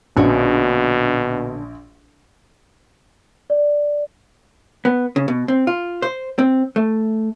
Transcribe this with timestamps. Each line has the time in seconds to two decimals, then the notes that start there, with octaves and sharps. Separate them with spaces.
0.17 A#1 B2 D3 C#4 F#4
3.50 D5
4.85 B3
5.16 C#3
5.28 B2
5.48 C4
5.67 F4
6.02 C5
6.39 C4
6.76 A3